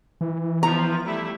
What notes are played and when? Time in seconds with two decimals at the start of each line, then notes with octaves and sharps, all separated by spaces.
0.21 E3
0.63 F3 B3 A#5
1.05 G3 A3 E4